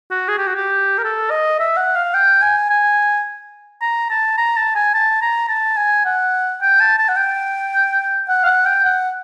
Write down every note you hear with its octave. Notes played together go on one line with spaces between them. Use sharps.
F#4
G#4
G4
F#4
G4
A#4
A4
D#5
E5
F#5
F5
G5
G#5
G#5
A#5
A5
A#5
A5
G#5
A5
A#5
A5
G#5
F#5
G5
A5
A5
F#5
G5
F#5
F5
F#5
G5
F#5